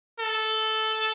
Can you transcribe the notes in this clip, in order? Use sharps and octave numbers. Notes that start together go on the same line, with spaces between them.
A4